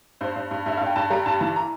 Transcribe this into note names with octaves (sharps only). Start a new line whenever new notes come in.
G2 C5
G2
G2
G2 E5
G2 F5
G5
G2 A5
G3 A#5
G2 A5
E3 A5
A#5